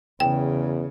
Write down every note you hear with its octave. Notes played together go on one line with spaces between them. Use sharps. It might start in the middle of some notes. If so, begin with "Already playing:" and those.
E2 C#3 G5